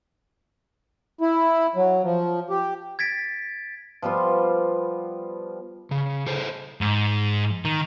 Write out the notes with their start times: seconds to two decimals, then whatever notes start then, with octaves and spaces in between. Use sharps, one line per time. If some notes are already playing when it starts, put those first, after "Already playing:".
1.21 E4
1.76 F#3
2.03 F3
2.50 G4
2.99 G#6 A6 B6 D7
4.02 F3 G3 B3 F4
5.91 C#3
6.27 G#4 A4 C5
6.81 G#2
7.65 D#3